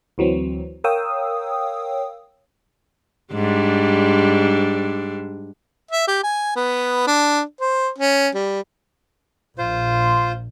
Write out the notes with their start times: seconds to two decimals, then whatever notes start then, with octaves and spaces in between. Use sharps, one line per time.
0.18 D2 E3 F#3 C4
0.84 A#4 C#5 F5 G5 D#6 E6
3.33 G#2 G3 D4
5.91 E5
6.08 G4
6.23 G#5
6.56 B3
7.07 D4
7.60 C5
7.98 C#4
8.35 G3
9.58 A#1 F4 C5